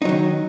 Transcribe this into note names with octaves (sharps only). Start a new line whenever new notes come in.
D#3 F#3 D#4